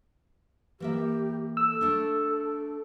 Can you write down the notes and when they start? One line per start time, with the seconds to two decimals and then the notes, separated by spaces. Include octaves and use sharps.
0.80 E3 A#3 G4 E5
1.57 A4 E6
1.81 A3 D4